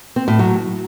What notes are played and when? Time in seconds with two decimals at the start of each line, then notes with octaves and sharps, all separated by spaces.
0.16 C4
0.28 A2
0.39 F#3